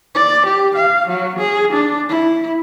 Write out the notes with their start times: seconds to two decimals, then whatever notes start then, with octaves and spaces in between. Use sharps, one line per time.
0.15 D5
0.46 G4
0.76 F5
1.08 F#3
1.39 G#4
1.72 D4
2.09 E4